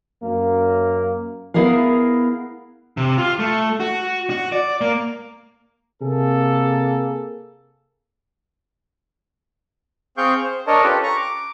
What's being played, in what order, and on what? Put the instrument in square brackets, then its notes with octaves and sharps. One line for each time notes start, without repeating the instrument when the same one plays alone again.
[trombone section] F#2 A#3
[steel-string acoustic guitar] B3 E4 G#4 A#4 F5
[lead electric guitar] C3
F4
A3
F#4
F#4
D5
A#3
[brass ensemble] C3 A#3 G#4 A4
[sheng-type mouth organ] C4 G#4 F5 G5 C#6 G6
C5
D4 A#4 C#5 D#5 A5
C#4 F4 G4 A4 B4
A#5 C#6
D6